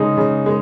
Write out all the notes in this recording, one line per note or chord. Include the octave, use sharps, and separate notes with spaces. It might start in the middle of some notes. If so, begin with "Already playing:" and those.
Already playing: C#3 G#3 D#4 G#4
C#3
G#3